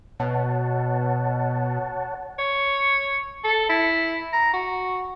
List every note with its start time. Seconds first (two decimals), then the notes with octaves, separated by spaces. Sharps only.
0.20 B2 C#5 F#5 A5
2.39 C#5
3.44 A4
3.70 E4
4.33 A#5
4.54 F#4